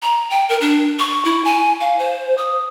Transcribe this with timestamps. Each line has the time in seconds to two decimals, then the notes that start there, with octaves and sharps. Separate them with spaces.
0.02 A#5
0.30 G5
0.49 A#4
0.61 D4
0.99 C#6
1.25 E4
1.45 G#5
1.80 F5
1.99 C5
2.38 D#6